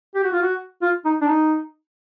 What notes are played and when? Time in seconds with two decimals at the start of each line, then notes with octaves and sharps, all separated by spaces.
0.15 G4
0.24 F#4
0.33 F4
0.42 F#4
0.82 F4
1.05 D#4
1.21 D4
1.27 D#4